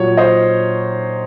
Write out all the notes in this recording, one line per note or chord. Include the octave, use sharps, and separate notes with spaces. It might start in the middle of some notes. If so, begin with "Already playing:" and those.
Already playing: A#2 F#3 C#5
C5 D#5